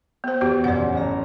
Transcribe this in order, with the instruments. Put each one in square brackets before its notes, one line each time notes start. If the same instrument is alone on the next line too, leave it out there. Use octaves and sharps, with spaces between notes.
[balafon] B3 C5
[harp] E2 [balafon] B3 F#4 G4
[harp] A#1 F#2 [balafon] D5 F#5
[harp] A1 A#5